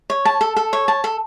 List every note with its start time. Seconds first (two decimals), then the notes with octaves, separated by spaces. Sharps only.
0.10 C#5
0.25 A5
0.41 A4
0.56 A4
0.73 C#5
0.88 A5
1.04 A4